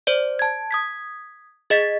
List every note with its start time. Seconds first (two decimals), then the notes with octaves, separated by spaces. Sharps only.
0.07 C5 D5
0.39 A5 G#6
0.71 D#6 G#6 B6
1.70 G#4 D#5 A6 B6